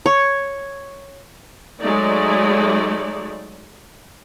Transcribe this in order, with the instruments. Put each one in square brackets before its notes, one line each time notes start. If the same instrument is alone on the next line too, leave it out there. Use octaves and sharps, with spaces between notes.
[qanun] C#5
[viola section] F#3 G#3 A3 D#4 D5